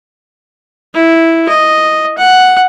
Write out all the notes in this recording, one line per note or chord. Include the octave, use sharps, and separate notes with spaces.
E4
D#5
F#5